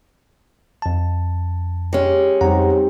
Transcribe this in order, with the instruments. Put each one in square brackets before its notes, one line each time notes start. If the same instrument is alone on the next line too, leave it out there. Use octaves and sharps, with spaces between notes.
[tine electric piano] F2 A5
[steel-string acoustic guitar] G#3 C#4 [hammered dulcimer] G4
[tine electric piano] F2 F#5 A#5 [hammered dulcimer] G3 C4 D#4